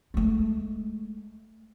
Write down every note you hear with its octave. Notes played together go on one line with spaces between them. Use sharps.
G#3 A3